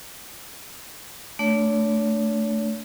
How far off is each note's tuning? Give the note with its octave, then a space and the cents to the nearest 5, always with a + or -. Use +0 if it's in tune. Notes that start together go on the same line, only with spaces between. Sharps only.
A3 +0 D4 +0 C#5 +40